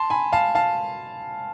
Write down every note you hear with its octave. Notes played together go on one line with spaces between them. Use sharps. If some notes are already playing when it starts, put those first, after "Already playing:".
Already playing: A5 C6
G#5 B5
F5 A5
F5 A5